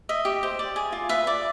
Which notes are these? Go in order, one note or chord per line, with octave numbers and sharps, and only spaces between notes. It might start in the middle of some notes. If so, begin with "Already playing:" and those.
D#5 E5
G4
C5
D5
G#4
F4
B4 E5
D5